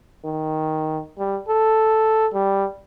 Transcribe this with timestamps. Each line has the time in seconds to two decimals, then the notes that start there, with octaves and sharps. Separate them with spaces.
0.25 D#3
1.18 G3
1.48 A4
2.33 G3